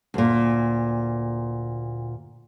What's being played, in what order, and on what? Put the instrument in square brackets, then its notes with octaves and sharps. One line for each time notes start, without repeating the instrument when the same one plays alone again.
[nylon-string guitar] D2 A#2